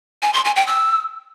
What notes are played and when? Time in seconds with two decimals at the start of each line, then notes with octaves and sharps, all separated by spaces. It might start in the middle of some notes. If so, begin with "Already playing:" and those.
0.22 G#5
0.34 C6
0.45 G#5
0.56 G5
0.67 E6